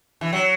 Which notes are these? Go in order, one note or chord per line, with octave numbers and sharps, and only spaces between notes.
E3
F#3